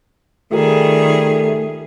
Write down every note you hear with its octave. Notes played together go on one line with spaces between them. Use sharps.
D#3 G3 A3 F4 G4 G#4 A#4